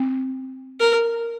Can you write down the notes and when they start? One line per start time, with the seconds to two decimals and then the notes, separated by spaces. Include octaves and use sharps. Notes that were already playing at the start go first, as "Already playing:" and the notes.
Already playing: C4
0.80 A#4